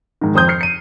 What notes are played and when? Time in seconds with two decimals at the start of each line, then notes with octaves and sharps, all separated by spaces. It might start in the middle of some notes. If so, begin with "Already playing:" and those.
0.21 G#2 D#3
0.34 F2 C5 D#6 G6
0.48 F6 G6 C7 C#7
0.61 C#7 D#7